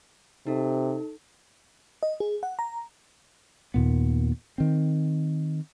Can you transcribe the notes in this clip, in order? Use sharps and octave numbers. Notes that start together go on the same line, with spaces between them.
C3 D#4 A4
D#5
G#4
F#5
A#5
D#2 A#2 B3
D#3 C4